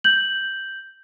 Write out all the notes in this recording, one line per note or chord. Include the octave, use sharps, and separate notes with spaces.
G6 F#7